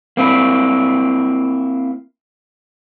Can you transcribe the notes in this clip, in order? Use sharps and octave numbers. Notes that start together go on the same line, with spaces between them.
A#3 C4 E4